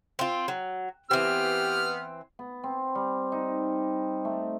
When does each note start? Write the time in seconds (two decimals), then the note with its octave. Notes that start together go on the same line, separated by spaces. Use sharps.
0.19 C4 F4
0.48 F#3
1.11 E3 B3 C4 G4 F6
2.39 B3
2.64 C4
2.95 G3
3.32 D#4
4.25 A3